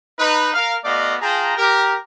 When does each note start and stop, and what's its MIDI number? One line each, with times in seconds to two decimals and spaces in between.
0.19 0.53 63
0.19 0.53 71
0.54 0.76 70
0.54 0.76 77
0.84 1.15 57
0.84 1.15 59
0.84 1.15 66
0.84 1.15 74
0.84 1.15 75
0.84 1.15 77
1.21 1.58 65
1.21 1.58 68
1.21 1.58 79
1.21 1.58 81
1.21 1.58 82
1.58 1.95 67
1.58 1.95 70